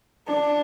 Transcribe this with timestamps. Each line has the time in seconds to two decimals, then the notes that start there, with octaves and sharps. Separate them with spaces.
0.27 D4